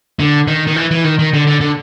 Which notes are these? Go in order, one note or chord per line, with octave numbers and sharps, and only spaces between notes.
D3
D#3
D#3
E3
E3
D#3
D#3
D3
D3
D3